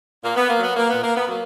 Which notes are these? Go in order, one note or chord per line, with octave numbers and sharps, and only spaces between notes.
A#2 A#3
B3
A#3
F#3
B3
A#3
A#2 B3
A#3
B3
F#3 A#3